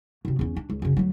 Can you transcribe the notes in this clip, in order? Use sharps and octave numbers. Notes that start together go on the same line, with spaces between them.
F#2 C3
E2 C#4
D4
C#2
F#2 C#3
D2 F#3